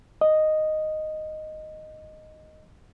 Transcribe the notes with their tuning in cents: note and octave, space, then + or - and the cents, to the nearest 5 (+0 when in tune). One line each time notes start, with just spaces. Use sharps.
D#5 -5